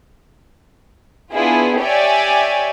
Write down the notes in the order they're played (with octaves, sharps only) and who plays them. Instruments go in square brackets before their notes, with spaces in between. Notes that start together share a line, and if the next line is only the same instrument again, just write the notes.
[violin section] B3 D4 E4 F4 G#4
G4 C#5 D5 E5 G5 G#5